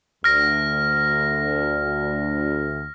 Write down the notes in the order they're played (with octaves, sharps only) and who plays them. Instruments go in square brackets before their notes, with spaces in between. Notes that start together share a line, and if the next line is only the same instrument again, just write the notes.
[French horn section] D2 [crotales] F6 A#6